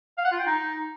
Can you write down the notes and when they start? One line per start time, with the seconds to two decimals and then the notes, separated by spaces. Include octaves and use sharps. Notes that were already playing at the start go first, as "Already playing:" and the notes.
0.18 F5
0.25 F#5
0.32 F4
0.39 G5
0.46 D#4